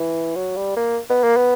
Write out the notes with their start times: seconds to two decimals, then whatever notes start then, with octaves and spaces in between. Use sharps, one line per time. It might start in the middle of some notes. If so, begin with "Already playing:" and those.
Already playing: E3
0.36 F#3
0.56 G3
0.77 A#3
1.10 B3
1.24 A#3
1.36 B3